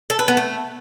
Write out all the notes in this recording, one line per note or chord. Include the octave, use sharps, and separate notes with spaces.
A4
B4
B3
A3